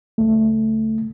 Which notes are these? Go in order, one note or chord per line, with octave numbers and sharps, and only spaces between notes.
C#2 A3